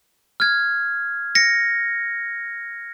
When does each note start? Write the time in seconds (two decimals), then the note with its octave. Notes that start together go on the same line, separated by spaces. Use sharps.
0.40 F6 G#6
1.35 A#6 C#7